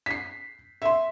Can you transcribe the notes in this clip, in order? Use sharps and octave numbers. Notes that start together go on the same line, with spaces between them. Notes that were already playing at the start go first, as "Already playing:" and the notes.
B6 C7
E5 C6